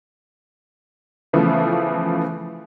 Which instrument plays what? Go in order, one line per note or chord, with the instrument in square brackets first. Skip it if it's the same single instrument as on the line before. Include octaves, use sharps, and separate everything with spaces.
[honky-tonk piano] C#3 E3 F3 A3 B3